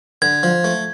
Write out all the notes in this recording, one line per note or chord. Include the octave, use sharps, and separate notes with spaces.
D3 G#6
F3
A3